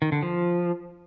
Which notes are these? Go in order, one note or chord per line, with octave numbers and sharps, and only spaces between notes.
D#3
D3
F3